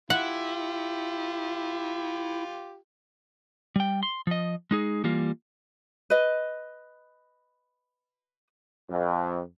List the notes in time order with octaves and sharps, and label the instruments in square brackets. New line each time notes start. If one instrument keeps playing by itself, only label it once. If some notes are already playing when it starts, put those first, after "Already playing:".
[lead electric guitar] E4 [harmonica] F4 G4 [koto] F#5
[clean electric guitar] G3 G5
C6
F3 D#5
G#3 D#4 G#4
E3 G3 A#3 F4
[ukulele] B4 D#5
[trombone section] F2